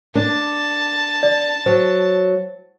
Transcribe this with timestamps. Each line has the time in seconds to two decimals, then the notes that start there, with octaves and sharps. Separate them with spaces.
0.15 D4 A5
1.23 D5
1.66 F#3 C5